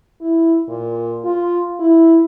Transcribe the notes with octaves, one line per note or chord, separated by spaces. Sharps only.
E4
A#2
F4
E4